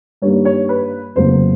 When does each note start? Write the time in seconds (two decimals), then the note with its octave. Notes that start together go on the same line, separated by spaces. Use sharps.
0.22 G2 D#3 G3 A#3 C#5
0.45 C#5
0.69 B4
1.16 F1 F2 C#3 F#3 A#3 C5